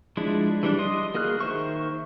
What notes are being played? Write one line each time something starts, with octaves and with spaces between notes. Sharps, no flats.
F3 G#3 D4 E4
E3 G3 D4
D#5 C6 D#6
A#3 F#4 G#4 F6 F#6
D#3 C5 E5 C#6